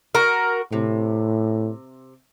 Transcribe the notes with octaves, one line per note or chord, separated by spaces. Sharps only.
F#4 A#4
A2 C3